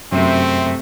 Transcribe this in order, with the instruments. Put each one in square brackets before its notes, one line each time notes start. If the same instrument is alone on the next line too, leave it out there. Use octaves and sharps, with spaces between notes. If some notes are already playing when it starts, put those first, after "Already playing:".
[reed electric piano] F#2 [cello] C3 A3 [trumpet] C4